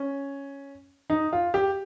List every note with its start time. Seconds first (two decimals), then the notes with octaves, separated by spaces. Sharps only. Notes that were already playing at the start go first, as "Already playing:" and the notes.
Already playing: C#4
1.10 D#4
1.33 F4
1.54 G4